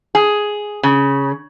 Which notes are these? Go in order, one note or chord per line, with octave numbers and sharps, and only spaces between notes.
G#4
C#3